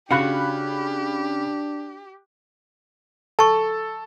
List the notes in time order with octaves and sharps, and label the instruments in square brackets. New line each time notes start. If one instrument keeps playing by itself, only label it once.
[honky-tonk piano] C#3 B5 F#6 [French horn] D4 [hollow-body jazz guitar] F#4 F5 F#5 [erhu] G4
[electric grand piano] A4 [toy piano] A5 C#6